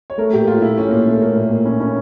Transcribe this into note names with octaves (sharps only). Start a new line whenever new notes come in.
C#5
A3 A#4
A#2 G4
A#2 F4
A#2 E4
A#2 C#4
A#2 A#3
A3
A3 A#3
A#2
A#2
C#4
C#4